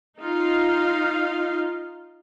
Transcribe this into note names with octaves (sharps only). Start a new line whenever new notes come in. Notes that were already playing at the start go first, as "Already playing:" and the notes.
D#4 F4 F5